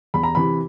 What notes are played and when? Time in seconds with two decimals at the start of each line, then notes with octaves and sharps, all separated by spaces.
0.14 E2 B5
0.23 A#5
0.35 C3 E3 B5